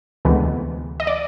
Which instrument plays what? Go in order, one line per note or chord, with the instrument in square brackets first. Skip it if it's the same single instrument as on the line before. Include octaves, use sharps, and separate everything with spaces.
[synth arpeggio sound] D2 C3 E3 G#3 B3
D#5
D5